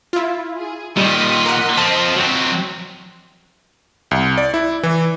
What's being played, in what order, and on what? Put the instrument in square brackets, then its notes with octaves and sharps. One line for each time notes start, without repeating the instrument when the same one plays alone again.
[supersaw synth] E4 F4
[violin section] G#4
[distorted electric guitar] A#2 D#3 [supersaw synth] G3 [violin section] D#5 C6 B6
[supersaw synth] A#4 F#5
[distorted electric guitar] F3 C4 [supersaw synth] A5
[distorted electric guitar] F#3 C4
[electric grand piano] C2
D5
E4
E3